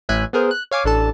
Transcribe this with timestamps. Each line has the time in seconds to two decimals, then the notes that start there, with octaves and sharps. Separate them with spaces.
0.09 A1 A2 E5 G#5 F#6
0.33 B3 G#4 A#4 C5
0.51 F#6
0.71 C#5 F5 G#5 D6
0.84 A1 D4 A4 A5